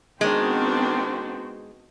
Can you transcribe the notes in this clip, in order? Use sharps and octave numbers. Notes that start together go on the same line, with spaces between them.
D#3 G#3 B3 C4 D4 F#4 C5 G5